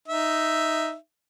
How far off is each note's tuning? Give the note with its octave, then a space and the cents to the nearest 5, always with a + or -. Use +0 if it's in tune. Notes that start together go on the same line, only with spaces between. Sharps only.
D#4 +0 E5 +0